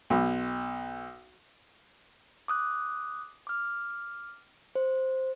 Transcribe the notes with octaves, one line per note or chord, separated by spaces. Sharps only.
B1
D6 D#6 F#6
D6 F6
C5